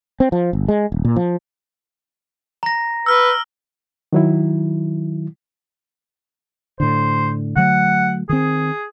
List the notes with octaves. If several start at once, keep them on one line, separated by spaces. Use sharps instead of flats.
C4
F3
G1
G#3
D#1
A#2
F3
A#5 A#6
B4 E6 F6
D#3 F#3 E4
A2 D3 C5
D3 F#3 A3 F#5
D#3 C4 G#4